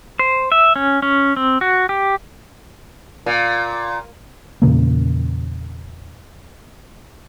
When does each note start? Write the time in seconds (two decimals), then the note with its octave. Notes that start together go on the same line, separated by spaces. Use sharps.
0.19 C5
0.52 E5
0.76 C#4
1.02 C#4
1.36 C4
1.61 F#4
1.89 G4
3.26 A#2
4.62 E2 A#2 C#3 A#3